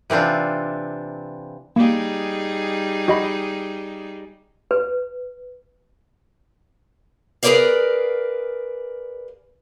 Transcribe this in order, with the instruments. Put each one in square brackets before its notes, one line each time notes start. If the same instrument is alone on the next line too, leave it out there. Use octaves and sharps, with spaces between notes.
[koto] C3 E3 C4 D4 F4
[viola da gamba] G3 D#4 G#4 [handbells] A#3
[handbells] F#4 D#5 B5
[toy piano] B4
[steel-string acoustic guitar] G#4 A#4 B4 C#5 D5 F5